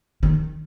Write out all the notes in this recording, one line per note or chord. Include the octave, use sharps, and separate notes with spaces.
D#3